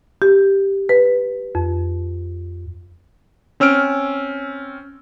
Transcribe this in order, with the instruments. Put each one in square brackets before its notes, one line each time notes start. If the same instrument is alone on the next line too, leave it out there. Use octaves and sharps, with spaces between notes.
[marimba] G4
B4
F2
[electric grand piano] C4 C#4 E6 F6 D7